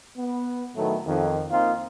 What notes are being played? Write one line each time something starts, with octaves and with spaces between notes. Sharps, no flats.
B3
A2 D#3 F#3 A3 B3
F2 D#3
A#3 C4 D#4 F4